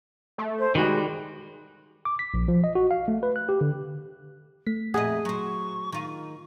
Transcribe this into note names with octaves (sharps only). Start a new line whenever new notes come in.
A3
C5
D#3 G3 G#3 F#4
D6
B6
A#1
F3
D#5
F#4
F5
A3
B4
F#6
G4
D3
A3 B6
F2 A#2 G#4 D#5 E5 F#5
F#3 C5 C#6
D#3 F4